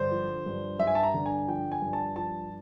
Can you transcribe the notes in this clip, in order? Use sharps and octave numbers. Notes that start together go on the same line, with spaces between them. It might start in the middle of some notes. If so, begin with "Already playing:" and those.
Already playing: G2 D3 C5
F3
G2
G2 E5
G#5
A5
A#5
D3
G#5
F3 G5
G#5
G2
A5
F3 A5